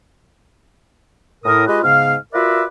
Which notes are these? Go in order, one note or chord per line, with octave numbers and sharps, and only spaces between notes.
A2 A#4 D#6
G#3 F4 G4 B4 D#5
G#2 C#3 B3 F5
F4 F#4 A#4 B4 D5 E5